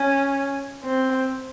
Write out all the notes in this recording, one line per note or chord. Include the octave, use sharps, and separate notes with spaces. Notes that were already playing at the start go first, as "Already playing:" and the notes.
Already playing: C#4
C4